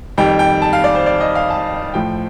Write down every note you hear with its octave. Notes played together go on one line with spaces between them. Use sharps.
F2 D#3 G3 G5
G5
A5
F5
D5
C5
D5
D#5
F5
A5
A2 F3 G5